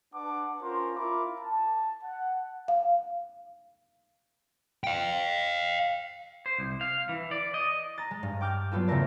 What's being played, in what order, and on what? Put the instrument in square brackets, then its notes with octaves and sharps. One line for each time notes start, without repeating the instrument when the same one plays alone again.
[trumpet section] D4 B4 F#5 A5 D6
C#4 F4 A#4 C5
E4 F4 A#4 B5 D6
A5
F#5
[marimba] F5
[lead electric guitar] F5 G5
[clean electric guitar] C5
C2
F5
E3
D5
D#5
[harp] A#5 A6
G#3
G2
G5 D6 F6 G6 A6
F#3 G3 B3 F4 A4
E2 C#3 A3 A#4 D5